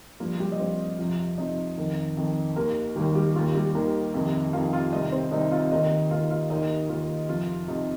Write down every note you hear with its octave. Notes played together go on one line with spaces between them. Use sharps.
G2 F3 A#3 A#4
G3 G4
D#5
G2 F3 C4 C5
F2 C3 F3
F2 C3 F3 D#4 D#5
F2 D#3
F2 D#3
D#2 D#3 A#3 A#4
D#2 D#3 G3 G4
G3 G4
D#2 D#3 F4
G3 G4
D#2 D#3 A#3 A#4
F2 C3 D#3
F2 C3 D#3 F4 F5
F4 F5
C2 C3 D#3 D#4 D#5
C4 C5
C2 C3 D#3 D#4 D#5
F4 F5
D#2 D#3 D#4 D#5
D#2 D#3 F4 F5
F4 F5
D#2 D#3 D#4 D#5
D#2 D#3 F4
F2 C3 F3 F4
F2 C3 F3 D#4